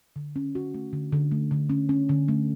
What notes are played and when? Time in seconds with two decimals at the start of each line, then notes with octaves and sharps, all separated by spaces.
0.16 D3
0.36 C#4
0.55 F#4
0.74 A3
0.93 D3
1.12 D3
1.31 A3
1.51 D3
1.70 C#4
1.89 C#4
2.09 D3
2.28 A3